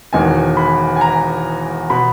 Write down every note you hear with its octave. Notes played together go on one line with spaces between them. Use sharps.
E1 E2 D#3 G#5
B5
G#5
A#5
B2 B5